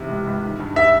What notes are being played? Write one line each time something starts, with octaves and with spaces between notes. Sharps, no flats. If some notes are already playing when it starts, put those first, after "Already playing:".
Already playing: B1 C3 E3
C#2
C#2
D#3
G2
G3 E5